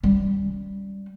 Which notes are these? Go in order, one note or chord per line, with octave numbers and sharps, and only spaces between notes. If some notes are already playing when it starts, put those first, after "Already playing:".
G3 C#4